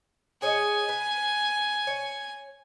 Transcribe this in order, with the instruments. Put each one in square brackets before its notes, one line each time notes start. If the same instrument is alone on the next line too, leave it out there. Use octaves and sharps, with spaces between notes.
[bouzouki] G#4 C#5 D#5 [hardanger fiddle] G#5
[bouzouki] B4
C#5